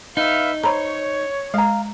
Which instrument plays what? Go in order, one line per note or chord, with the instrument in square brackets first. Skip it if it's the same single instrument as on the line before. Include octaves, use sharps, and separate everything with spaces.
[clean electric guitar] D#4 [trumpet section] B4 E5 F5
[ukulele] C5 [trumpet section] C#5 [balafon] A#5 B5
[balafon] G#3 [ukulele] F5 A#5